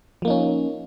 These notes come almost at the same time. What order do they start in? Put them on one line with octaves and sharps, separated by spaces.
F3 A#3 D#4 C#4